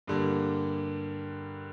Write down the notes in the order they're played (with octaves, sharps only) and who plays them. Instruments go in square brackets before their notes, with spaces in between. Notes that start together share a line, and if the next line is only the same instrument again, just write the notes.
[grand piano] G2 D3 G3 A#3